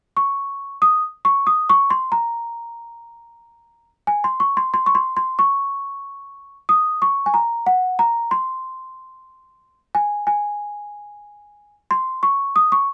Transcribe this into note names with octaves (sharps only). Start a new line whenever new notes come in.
C#6
D#6
C#6
D#6
C#6
C6
A#5
G#5
C6
C#6
C6
C6
C#6
C6
C6
C#6
D#6
C#6
G#5
A#5
F#5
A#5
C6
G#5
G#5
C6
C#6
D#6
C#6